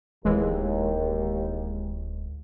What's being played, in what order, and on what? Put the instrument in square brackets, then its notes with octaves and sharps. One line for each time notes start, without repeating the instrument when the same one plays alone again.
[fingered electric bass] D1 [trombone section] D#2 [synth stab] E3 G#3